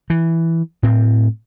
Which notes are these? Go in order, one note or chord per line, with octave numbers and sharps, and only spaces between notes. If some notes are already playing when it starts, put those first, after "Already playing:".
E3
A2 C4